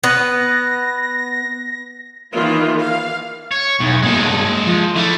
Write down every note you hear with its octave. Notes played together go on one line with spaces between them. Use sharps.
B3 B4 A#6
D#3 E3 A#3 F4
F5
C#5
B1 E2
G2 G#3 A#3 A4
F3
D3 A3 E4